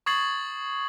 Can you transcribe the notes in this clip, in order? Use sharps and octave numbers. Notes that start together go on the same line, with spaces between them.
C#6 D#6 G#6 A6 C7 F#7